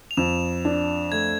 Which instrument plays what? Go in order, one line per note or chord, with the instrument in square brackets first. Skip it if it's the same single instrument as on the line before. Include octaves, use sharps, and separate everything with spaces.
[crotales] F7
[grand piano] F2 [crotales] E7
[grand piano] D4
[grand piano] A3 [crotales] G#6